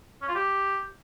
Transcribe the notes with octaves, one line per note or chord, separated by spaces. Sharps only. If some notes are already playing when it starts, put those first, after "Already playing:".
C#4
F4
G4